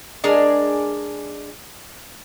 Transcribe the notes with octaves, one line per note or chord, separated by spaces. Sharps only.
G#3 D4 G#4 A#4 D5 G#5